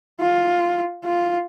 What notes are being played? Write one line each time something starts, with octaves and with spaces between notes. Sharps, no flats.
F4
F4